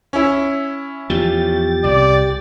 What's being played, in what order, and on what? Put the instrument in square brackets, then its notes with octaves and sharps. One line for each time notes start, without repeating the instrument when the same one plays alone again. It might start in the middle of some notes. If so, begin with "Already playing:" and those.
[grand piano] C#4 E4
[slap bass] E2 F3 [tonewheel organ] G4 A6
[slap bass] C2 [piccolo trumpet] D5